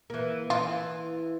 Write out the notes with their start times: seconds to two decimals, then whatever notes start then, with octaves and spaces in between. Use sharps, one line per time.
0.10 E3 A#3
0.50 E3 F4